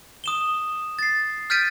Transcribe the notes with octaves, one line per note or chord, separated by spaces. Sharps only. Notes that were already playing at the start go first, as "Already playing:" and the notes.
D#6 E7 G7
A6 C7
F6 G6 A6 B6 D7 D#7